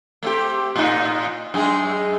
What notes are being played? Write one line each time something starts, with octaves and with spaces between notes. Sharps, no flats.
A3 C4 G4
A2 D#4
F#2 G#3 G#4